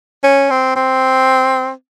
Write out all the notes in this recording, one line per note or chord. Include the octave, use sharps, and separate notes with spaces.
C#4
C4
C4